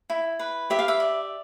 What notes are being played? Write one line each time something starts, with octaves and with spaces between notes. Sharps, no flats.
E4
B4
G4 E5
F5
E5
D5